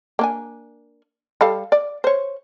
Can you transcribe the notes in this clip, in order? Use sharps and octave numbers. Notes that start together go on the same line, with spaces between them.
A#3 D4 G#5
G3 A4 F5
D5
C5 C#5